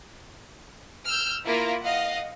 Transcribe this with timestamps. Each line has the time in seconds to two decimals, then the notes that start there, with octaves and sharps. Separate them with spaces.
1.08 E6 F6 G6
1.45 A#3 E4 F4 A#4
1.82 D#5 F5 F#5